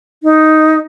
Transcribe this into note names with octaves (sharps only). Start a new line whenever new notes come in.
D#4